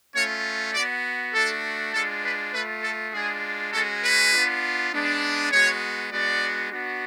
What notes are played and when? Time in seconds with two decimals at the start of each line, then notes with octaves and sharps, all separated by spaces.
0.15 A3 C#4 F4 C#5
0.74 B3 F#4 D5
1.34 A3 D4 F#4 A4
1.93 G#3 D4 F4 A4
2.23 B4
2.53 A3 F4 B4
2.83 A4
3.12 G#3 D4 F4 G#4
3.73 G#3 C#4 F#4 A4
4.03 B4
4.32 B3 D4 F4
4.92 G#3 B3 D4
5.51 G#3 B3 F#4 C#5
6.11 G#3 B3 D4 F#4 D5
6.71 B3 D4 F#4